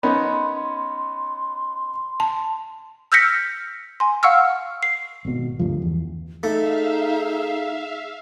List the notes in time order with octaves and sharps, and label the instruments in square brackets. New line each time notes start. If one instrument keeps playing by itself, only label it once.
[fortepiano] B3 C#4 D#4 [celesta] B5 [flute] C6
[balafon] A5
[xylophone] E6 F6 G6 A#6 B6 C#7
G#5 C6
F5 F#5 C#6 E6 F6
C7
[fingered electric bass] G#1 B2
D2 G2 F3
E2
[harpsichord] A3 [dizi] D#4 [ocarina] G#4 [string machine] E5 F5